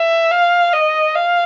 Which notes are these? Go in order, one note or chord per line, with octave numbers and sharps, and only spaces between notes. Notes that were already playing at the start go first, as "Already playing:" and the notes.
Already playing: E5
F5
D#5
F5